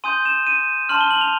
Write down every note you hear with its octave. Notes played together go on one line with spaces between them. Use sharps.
G#5 C6 D#6 G6 D#7
E7
D#7
A5 C6 F6 F#7
G7
F#7
F7